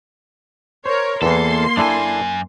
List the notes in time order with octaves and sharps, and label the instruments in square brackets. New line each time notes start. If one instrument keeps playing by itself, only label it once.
[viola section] A#4 C#5 [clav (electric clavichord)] C5
[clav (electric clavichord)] E2 E3 [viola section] A#3 C6 [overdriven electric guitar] A4
[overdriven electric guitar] F#2 G#5 [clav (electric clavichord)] D4 E4 A4